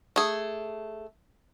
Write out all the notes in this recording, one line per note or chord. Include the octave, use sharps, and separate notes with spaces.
A3 G#4